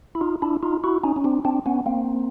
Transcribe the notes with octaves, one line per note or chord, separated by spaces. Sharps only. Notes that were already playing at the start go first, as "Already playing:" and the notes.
E4
D#4 F4
D4 E4
D#4 F4
E4 F#4
C#4 D#4
C#4
C4 D4
C4 D4
B3 C#4
A#3 C4